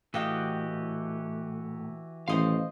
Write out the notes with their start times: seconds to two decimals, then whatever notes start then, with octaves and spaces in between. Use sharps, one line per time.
0.14 A2 E3 F#4 G4 D#5 F5 G5
2.28 A1 D#3 C5 D#5 F5 C6